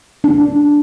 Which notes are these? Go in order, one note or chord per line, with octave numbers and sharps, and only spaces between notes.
D4